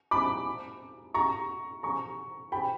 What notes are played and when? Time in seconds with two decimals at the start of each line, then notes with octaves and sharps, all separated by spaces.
0.11 B5 D6
1.14 A#5 C#6
1.83 A#5 C#6
2.52 G5 B5